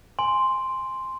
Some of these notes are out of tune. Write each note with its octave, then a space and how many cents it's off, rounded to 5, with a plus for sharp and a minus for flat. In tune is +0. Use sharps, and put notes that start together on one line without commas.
G#5 +0 C6 +0